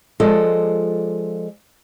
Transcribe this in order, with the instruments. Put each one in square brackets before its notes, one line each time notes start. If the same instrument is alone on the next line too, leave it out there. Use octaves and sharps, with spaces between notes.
[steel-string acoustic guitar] F3 G#3 F4 A4 D5 D#5